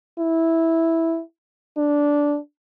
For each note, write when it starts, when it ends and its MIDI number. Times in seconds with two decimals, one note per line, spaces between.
0.19 1.21 64
1.77 2.37 62